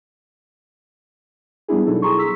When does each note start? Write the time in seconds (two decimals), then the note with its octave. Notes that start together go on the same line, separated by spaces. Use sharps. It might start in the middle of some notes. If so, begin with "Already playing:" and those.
1.68 G3 B3 D4 E4 G#4
1.86 B2 F#3 D#4 A4
2.02 G#4 A#5 C6 C#6
2.19 E6 B6